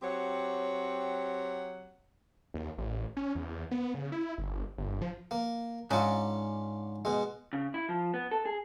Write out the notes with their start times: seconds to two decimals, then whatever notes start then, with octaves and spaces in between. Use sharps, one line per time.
0.02 F#3 C4 G4 C#5 F#5
2.54 D#2
2.78 A1
3.17 C#4
3.35 E2
3.71 B3
3.94 C#3
4.12 E4
4.38 G1
4.78 G1
5.02 F3
5.31 A#3
5.91 G#2 C#4 D4 F4
7.05 B2 G#3
7.53 C#3
7.74 E4
7.89 F3
8.14 B3
8.31 A4
8.46 G#4